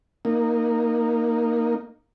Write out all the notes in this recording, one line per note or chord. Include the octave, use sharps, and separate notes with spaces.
A#3 D#4